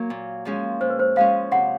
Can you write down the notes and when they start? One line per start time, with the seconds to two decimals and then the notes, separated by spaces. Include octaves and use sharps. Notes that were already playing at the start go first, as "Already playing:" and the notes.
Already playing: F#3 A#3
0.10 A#2
0.45 F3 G#3 C#4
0.81 A#2 C5
0.90 B4
0.99 C5
1.16 F3 G#3 C#4 F5
1.51 C3 F#5